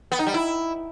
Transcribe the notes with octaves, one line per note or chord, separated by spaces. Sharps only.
B3
D#4
G3
E4